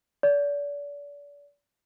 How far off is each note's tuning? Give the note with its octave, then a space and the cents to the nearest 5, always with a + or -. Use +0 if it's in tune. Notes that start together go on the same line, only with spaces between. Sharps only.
D5 -35